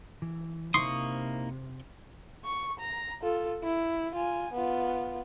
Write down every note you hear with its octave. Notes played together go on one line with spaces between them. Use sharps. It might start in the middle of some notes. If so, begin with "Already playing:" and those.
E3
C3 A#3 D#4 E4 C5 C6 C#6 D#6
C#6
A#5
F4 A4
E4
F4 G#5
B3 F4